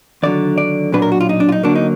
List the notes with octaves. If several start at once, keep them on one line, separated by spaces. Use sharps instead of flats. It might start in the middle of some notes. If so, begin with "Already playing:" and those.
D#2 D3 F#3 D5
D5
B1 A#2 F#3 D4 B4
A#4
F#4
F4
D#4
D4
F4
D#4
D2 D3 F#3 A#3 D4
D#4